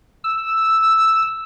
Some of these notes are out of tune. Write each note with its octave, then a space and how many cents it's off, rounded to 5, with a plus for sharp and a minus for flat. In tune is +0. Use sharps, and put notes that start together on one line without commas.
E6 +0